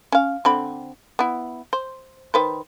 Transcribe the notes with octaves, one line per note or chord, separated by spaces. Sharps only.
C#4 F5
D3 C4 B5
B3 E4
C5
D#3 B4 C5